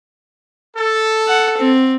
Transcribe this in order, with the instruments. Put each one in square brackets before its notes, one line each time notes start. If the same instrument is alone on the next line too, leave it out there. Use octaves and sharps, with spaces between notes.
[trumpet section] A4
[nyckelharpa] F#5
C4